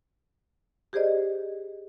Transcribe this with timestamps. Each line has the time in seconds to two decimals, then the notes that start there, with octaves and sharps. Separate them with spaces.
0.93 G4 G#4 C5 D5 D#5